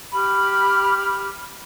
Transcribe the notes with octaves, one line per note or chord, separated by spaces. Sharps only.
G4 B5 F6